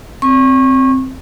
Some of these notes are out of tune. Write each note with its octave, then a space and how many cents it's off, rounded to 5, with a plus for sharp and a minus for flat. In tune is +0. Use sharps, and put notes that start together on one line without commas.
C4 +0 C#6 -20